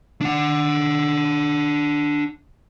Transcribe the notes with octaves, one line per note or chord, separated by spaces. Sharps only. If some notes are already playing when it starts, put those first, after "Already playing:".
D4 F#5